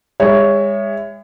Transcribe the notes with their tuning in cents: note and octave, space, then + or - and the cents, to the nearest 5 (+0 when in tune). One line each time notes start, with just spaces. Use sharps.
G#3 -40 C#5 +5 E5 +10